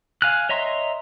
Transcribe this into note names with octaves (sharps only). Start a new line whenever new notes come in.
F5 G#5 F6 F#6
C#5 D#5 E5 A#5 C6